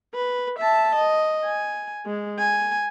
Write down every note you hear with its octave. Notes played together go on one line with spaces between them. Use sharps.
B4
E5 A5
D#5
G#5
G#3
G#5